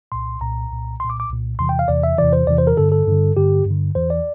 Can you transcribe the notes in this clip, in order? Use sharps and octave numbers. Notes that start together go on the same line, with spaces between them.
C2 A#2 C6
C2 A#2 A#5
C2 A#2
C2 A#2 C6
D6
D6
C2 A#2
E2 C3 E3 C6
G5
F5
E2 C3 E3 D5
E5
E2 C3 E3 D5
C5
E2 C3 E3 D5
C5
A#4
G2 D3 A4
A4
G2 D3
G2 D3 G4
G2 D3
E2 E3 C5
D5